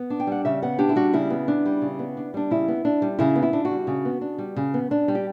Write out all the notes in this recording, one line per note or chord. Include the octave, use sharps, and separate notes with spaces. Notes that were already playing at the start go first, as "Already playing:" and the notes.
Already playing: B3
D4
G5
G3 F#5
C#3 E5
B3 F#5
D4 G4
E4
G3 F#4
C#3 E4
B3
D4
G3
C#3
B3
D4
G3 D4
C#3 E4
B3
D4
G3
C#3 E4
B3
E4
D4
F#4
G3
C#3
B3
D4
G3
C#3
B3
D4
G3
G4